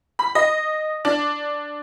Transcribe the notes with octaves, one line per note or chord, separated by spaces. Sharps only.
B5
D#5
D4